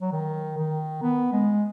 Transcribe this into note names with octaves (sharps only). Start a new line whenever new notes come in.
F#3
D#3
D#3
B3
G#3